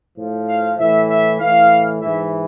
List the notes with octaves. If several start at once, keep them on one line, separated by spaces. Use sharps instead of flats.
A2 F3
F5
A2 E3 E5
E5
A2 E3 F5
G#2 E3 E5